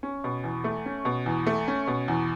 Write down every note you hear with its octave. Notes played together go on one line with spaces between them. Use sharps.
C#4
B2
E2
A3
C#4
B2
E2
A3
C#4
B2
E2